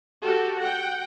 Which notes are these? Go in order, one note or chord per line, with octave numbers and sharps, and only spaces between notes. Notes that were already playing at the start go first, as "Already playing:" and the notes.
F#4 G4 A4
F#5 G5